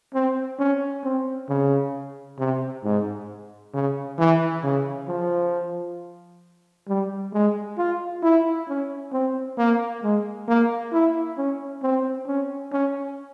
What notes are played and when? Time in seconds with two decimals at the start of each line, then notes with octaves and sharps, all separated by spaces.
0.14 C4
0.59 C#4
1.04 C4
1.49 C#3
2.39 C3
2.84 G#2
3.74 C#3
4.19 E3
4.64 C#3
5.08 F3
6.88 G3
7.33 G#3
7.78 F4
8.23 E4
8.69 C#4
9.13 C4
9.58 A#3
10.03 G#3
10.48 A#3
10.93 E4
11.38 C#4
11.83 C4
12.27 C#4
12.72 C#4